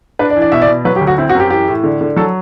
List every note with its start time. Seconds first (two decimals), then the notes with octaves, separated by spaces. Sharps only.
0.19 D4 B4
0.30 D5
0.36 E3
0.42 D5
0.52 B2 E5
0.62 D5
0.68 B2
0.85 F#3 B4
0.96 G4
1.01 D2
1.07 F#4
1.18 C4 E4
1.29 F#4
1.35 F#2 G4
1.50 E3 G4
1.68 A2
1.84 D3
2.01 D3
2.17 F#3 A4